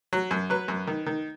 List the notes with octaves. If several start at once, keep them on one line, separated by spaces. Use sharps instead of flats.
F#3
F#2
F#3 B4
F#2
D#3
D#3